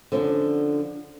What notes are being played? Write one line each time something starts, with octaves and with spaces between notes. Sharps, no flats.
D3 F3 C#4 D4